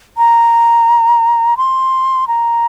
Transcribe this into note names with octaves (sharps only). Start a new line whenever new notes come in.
A#5
C6
A#5